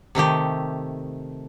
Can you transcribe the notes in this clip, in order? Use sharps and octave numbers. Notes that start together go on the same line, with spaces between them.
C3 D#3 A3 G4